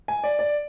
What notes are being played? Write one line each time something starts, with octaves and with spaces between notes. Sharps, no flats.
G#5
D5
D5